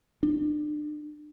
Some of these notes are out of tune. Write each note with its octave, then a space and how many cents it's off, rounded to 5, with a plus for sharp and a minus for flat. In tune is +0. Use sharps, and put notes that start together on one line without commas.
D4 +35